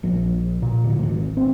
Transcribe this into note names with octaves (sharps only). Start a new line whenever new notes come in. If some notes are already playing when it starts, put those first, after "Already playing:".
A#1
A#2
D1
G#1
C4